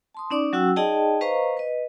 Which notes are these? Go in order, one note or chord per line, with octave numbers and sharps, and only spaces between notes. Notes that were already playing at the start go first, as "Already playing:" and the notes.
A5 C6 D#6
C#4 D#4 D5 D6
F#3 C#4 F#4 F#5 G5 E6
D#4 G#4 D5 D#5 G5 A5
B4 C5 D#5 F5 A#5 C#6
B4 D#5